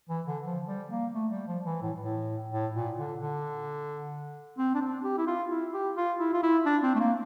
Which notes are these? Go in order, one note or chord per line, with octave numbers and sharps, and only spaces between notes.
E3
D3
F3
G3
A#3
A3
G3
F3
E3
A2
A2
A2
A#2
D3
D3
C4
D4
C4
G4
E4
F4
E4
G4
F4
E4
F4
E4
D4
C4
A3
A#3